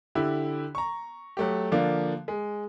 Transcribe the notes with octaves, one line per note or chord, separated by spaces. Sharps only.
D3 E4 G4
A#5 C#6
F#3 A3 G4
D3 F3 A#3 D4
G#3